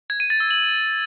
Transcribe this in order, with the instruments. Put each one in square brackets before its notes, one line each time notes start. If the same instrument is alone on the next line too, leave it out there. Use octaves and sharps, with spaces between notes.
[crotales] G#6
D#7
A6
E6
F#7